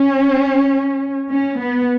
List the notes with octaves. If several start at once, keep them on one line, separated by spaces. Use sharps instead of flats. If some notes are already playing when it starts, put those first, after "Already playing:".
Already playing: C#4
C#4
B3